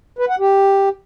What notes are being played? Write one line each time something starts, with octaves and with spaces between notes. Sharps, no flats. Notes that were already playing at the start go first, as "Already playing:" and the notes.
B4
F#5
G4